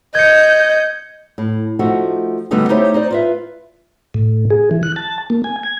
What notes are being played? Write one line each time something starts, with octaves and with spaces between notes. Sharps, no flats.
D#5 G6 G#6 C#7
A2
F3 A3 D#4 F#4
D3 G3 A3 B3 D#4 F#4
A3 D#4 E4 G4 C5 C#5
D#4 C5 D5
F4 B4 E5
A2
G#4
E3
F#6
A5
A#3
G#5
G#6